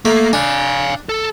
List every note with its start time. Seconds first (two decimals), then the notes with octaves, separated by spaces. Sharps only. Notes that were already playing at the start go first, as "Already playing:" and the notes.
0.05 A3 A#3
0.33 D4 F5 G#5
1.09 A4